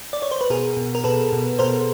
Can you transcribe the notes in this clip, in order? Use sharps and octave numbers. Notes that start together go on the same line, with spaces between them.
D5
C#5
C5
B4
B2 G#4 A#4
B2
A#4
B2 A4 B4
B2
B2 A#4 C5